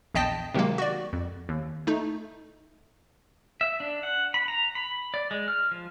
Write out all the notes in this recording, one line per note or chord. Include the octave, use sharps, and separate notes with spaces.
A#1 E2 D#5 G5 A5 B6
C3 D#3 F#3 G#3 A#3
F#4 D5
F2
D#2
A3 D#4
E5
D4
F#5
B5
A#5
B5
D5
G#3
F6
F3